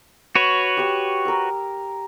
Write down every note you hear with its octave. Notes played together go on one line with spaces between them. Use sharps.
F#4 B4 C#5
G4 C#6
A#4 E6